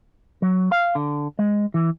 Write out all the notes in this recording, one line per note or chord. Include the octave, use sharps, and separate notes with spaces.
F#3
F5
D3
G#3
E3